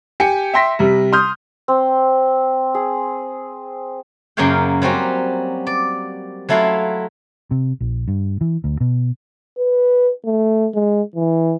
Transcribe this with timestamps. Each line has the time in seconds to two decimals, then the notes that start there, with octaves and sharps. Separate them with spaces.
0.20 G4 G5 G#5 C#7
0.54 E5 G5 C6 A#6 B6
0.79 C3 G3
1.13 C6 D#6 F6 G6
1.68 C4
2.74 G#4
4.37 F#2 C#3 A#3 C#5 F5 G5
4.82 F#3 G3 C4 C#4 F#4
5.67 D5
6.49 F#3 A3 E4 F4 F5 F#5
7.51 C3
7.81 A#1
8.08 G2
8.41 E3
8.64 D2
8.80 B2
9.58 B4
10.25 A3
10.74 G#3
11.15 E3